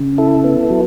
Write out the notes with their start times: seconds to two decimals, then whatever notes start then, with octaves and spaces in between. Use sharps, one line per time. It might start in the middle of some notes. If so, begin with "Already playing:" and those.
Already playing: C#3
0.18 E4 A4
0.44 B3
0.70 F#3